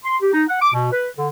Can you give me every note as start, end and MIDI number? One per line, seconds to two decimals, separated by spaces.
0.05 0.16 84
0.22 0.32 67
0.33 0.44 63
0.49 0.59 78
0.61 0.72 86
0.73 0.89 47
0.92 1.09 71
1.17 1.29 50